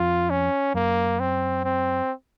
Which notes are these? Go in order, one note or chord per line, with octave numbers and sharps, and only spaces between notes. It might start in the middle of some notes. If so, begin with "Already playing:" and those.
Already playing: F2 F4
C#4
F#2 A#3
C4
C4